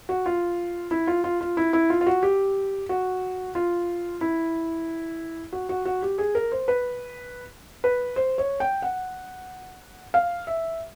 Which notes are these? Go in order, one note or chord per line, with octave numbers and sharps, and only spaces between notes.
F#4
F4
E4
F4
F4
F4
E4
E4
F4
F4
F#4
G4
F#4
F4
E4
F#4
F#4
F#4
G4
G#4
A#4
C5
B4
B4
C5
C#5
G5
F#5
F5
E5